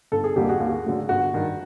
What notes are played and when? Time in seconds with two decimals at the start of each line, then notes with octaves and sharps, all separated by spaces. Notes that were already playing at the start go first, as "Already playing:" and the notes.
0.12 G1 A4
0.24 G#4
0.36 F2 D3 G3 A#3 G4
0.49 F#4 G#4
0.60 D#2
0.84 D3 F#3 A3
1.09 G1 F#4
1.34 G2 D#3